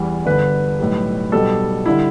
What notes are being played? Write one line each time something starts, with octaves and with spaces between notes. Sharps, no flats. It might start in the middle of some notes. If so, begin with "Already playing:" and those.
Already playing: E2 E3 G3
G1 G2 D3 B4
B1 A2 G3
B1 B2 G3 A4
D3 G3 E4